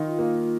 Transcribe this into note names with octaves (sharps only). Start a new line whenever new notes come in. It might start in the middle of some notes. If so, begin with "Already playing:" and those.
Already playing: D#3 D#4 F4
A#3